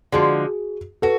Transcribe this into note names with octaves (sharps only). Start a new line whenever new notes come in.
D3 F3 G#3 F#4 G#4
F#4 A4 B4